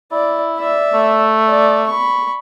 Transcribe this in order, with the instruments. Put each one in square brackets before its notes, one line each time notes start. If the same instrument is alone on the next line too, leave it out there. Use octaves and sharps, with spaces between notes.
[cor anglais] E4 [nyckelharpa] D5
[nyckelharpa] D5 E5
[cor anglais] A3
[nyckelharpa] D5
B5 C#6